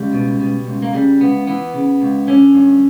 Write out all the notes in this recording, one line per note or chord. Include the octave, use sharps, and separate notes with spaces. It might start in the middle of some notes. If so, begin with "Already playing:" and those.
Already playing: C#2 G3
B2
B2
C#2
A#3
C#3 G3
C#2 B3
E3 B3
C#3
C#2
D3 C#4
G2